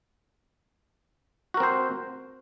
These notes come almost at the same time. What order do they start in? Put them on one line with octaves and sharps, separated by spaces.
F#4 A#4 C4 C5